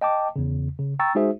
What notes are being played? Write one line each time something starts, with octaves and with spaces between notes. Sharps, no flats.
D#5 G5 A5 D6
E2 C#3
C#3
G5 A#5 C#6 E6 A6
G#3 D#4 F#4 G#4 C5 E5